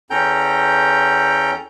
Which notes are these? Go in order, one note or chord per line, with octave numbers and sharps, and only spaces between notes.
E2 C#4 A4 G5 A#5 G6